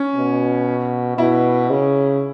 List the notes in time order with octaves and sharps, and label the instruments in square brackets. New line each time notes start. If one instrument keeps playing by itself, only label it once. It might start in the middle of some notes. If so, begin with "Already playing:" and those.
Already playing: [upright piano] C#4
[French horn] B2
[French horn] B2 [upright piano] E4
[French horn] C#3